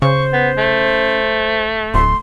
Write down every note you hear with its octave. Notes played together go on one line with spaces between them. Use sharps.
C#3 C5 C#6
B3
A3
D1 C6